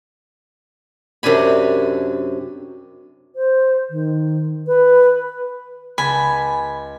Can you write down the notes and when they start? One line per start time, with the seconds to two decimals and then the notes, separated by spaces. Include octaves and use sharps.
1.23 F#2 C3 D4 G#5 B5
3.36 C5
3.90 D#3
4.67 B4
5.98 C#2 G#5 A5 B5 B6